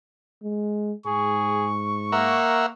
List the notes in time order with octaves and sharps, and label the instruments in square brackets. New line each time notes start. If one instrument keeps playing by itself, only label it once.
[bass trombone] G#3
[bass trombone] G#2 [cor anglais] G#4 [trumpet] C#6
[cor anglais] A#3 [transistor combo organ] A#4 E5 F#5